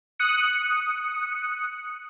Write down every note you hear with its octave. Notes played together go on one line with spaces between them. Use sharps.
D#6 F#6 C#7